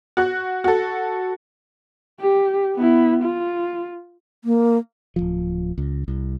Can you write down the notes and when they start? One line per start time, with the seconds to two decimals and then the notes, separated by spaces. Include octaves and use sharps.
0.17 F#4 F#6
0.64 F#4 A4
2.20 G4
2.76 B3 E4
3.23 F4
4.44 A#3
5.16 D1 G1 F3
5.78 C#2
6.08 C2